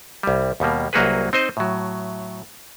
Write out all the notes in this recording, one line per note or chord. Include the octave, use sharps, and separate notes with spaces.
C2 G3
D#2 B2 G3 A#3
C2 F#3 A#3 F#4 G#4 B4
C4 D#4 C5 D#5
A2 F#3